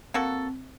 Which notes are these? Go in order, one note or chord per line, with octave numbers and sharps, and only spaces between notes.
A#3 C4 F#4 A4